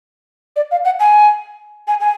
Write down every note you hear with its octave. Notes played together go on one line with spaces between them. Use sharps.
D5
F5
F#5
G#5
G#5
G#5